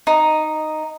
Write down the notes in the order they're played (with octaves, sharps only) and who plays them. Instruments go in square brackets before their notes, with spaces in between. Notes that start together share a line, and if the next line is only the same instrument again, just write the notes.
[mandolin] D#4